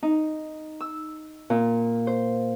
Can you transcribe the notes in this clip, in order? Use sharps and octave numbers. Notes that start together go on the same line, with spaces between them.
D#4
E6
A#2
C5